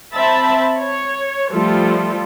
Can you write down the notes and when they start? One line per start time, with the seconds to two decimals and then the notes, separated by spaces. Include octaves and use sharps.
0.14 C4 E5 A5 B5
0.79 C#5
1.51 F3 G3 A3 F4 A4